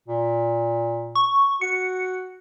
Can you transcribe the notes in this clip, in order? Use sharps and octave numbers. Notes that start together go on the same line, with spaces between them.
A#2
C#6
F#4 C#7